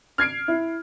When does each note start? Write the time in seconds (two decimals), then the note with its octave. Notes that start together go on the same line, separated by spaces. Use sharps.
0.18 F6 G#6 C7 D7
0.48 E4